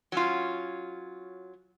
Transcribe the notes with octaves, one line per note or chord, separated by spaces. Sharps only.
F#3 C#4 F4